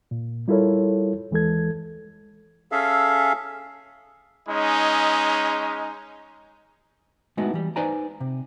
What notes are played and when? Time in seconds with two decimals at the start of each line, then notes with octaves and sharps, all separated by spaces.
0.11 A#2
0.48 G3 E4 F4 A4 A#4 C#5
1.31 D#2 E3 G#3 A4 G#6
2.72 C#4 G#4 A4 E5 F5
4.48 G#3 C#4 D#4
7.37 G#3 A3 B3 D#4 E4 F#4
7.53 E3 G3
7.76 D#4 B4 C5 D5 G#5 A#5
8.20 C3